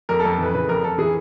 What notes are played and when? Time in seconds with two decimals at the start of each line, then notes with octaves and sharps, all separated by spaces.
0.09 F2 A#4
0.20 A4
0.24 F2
0.31 A4
0.38 E3 B4
0.54 C#3 B4
0.68 F2 A#4
0.83 F2 A4
0.98 E3 G#4